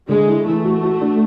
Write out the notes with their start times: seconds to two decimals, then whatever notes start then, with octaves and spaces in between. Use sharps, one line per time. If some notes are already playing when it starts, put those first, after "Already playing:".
0.09 D3 G#3
0.27 E4
0.46 E3 A3
0.64 F#4
0.83 F#4
1.01 D4